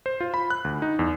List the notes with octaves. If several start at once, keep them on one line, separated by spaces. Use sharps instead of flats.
C5
F4
B5
F#6
D2
D#4
E2